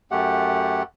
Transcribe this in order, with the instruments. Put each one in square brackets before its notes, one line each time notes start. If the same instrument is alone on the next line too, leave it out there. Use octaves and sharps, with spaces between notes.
[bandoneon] F#2 A3 G4 F#5